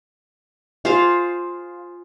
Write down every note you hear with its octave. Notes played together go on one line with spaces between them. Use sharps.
F4 G#4 C5 F5